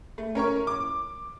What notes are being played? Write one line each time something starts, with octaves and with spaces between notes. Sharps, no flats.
A3
C#4 A#4 C#5 C#6
D6